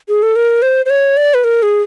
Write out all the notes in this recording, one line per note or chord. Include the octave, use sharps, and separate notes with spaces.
G#4
A4
A#4
C5
C5
C#5
D5
B4
A#4
G#4